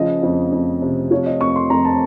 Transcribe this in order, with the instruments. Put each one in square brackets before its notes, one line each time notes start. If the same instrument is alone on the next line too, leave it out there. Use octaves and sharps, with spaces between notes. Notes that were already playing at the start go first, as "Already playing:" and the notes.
Already playing: [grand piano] C#3 F3 D#5
F2
F2
C3
F3 C#5
D#5
F2 C#6
C6
F2 A#5
A5